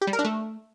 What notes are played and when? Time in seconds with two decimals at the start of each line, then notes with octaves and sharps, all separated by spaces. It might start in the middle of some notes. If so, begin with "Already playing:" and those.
0.01 G4
0.07 G3
0.13 A#4
0.19 D4
0.24 A3